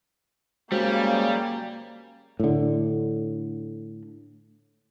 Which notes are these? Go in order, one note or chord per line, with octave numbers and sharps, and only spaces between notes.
C#3 G3 G#3 A#3 F#4 C5
A2 D3